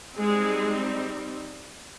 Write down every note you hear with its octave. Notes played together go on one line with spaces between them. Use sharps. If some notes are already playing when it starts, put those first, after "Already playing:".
G3 G#3 C4 D#4 G#4